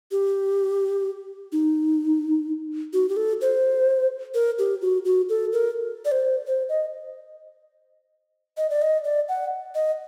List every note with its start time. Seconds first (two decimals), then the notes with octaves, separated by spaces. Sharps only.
0.12 G4
1.52 D#4
2.93 F#4
3.09 G4
3.17 A4
3.41 C5
4.34 A#4
4.59 G4
4.82 F#4
5.05 F#4
5.29 A4
5.53 A#4
6.05 D5
6.12 C5
6.47 C5
6.69 D#5
8.57 D#5
8.70 D5
8.82 D#5
9.04 D5
9.29 F#5
9.75 D#5